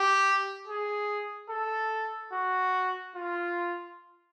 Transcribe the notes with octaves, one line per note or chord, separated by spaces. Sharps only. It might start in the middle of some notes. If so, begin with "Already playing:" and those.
Already playing: G4
G#4
A4
F#4
F4